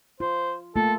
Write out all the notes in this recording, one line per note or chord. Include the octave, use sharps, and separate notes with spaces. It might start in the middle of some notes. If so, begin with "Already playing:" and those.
F4 C5
A3 A#3 F4 A4